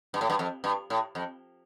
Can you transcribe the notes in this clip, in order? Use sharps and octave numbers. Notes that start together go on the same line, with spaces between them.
G2
A2
G2
F2
G2
A2
F2